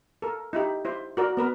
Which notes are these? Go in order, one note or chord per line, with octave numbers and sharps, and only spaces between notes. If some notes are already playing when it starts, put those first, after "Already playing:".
A4 A#4
D#4 E4 G4
E4 C5
F#4 A#4 D5
B3 A#4 B4